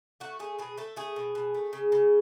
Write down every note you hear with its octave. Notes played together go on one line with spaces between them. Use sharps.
A3 F#4
A3 G#4
B2 G#4
A3 A4
A3 G#4
B2
B2
A3
C#3
C#3